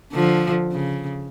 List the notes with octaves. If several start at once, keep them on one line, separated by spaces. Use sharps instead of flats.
D3 F3
C#3